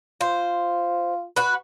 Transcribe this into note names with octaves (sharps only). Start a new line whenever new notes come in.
F4 C5
F#4 B4